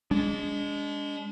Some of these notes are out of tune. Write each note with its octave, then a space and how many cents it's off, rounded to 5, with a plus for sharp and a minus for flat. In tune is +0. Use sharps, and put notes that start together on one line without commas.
G#3 -15 D4 -35